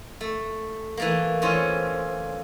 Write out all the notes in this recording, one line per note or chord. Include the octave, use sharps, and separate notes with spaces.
A3
E3 A3 A#3
E3 C4 C#4 F4 C#5 D#5